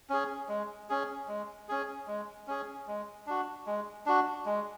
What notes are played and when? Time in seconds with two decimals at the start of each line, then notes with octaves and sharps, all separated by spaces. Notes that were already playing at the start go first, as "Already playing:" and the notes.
0.10 C#4 G#4
0.49 G#3
0.89 C#4 G#4
1.28 G#3
1.69 C#4 G#4
2.07 G#3
2.48 C#4 G#4
2.88 G#3
3.27 D4 F#4
3.66 G#3
4.06 D4 F#4
4.46 G#3